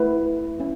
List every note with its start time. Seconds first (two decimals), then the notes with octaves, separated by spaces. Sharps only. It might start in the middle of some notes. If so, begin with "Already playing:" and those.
Already playing: A3 E4 B4
0.60 C#4 E4